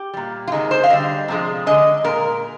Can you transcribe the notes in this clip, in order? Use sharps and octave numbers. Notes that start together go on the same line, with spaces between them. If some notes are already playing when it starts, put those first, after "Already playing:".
Already playing: G4
A#2 G3
F4
C3 D#3 G#3 D#4
C5
F5
D3 G3 D#5
C3 F3 G#3
D3 G#3 D#5
A#2 G#3 A#4